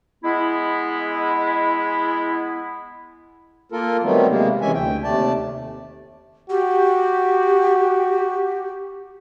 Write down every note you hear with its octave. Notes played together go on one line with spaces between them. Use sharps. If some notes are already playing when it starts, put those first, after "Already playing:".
G#3 B3 E4
A#3 F4 A4 A#4
D#3 F#3 G3 A3 B3 C4
C3 G#3 A#3
C3 E3 G#3 C#4 E5 G#5
D2 G5
D#2 C3 A3 D5 A5
F#4 G4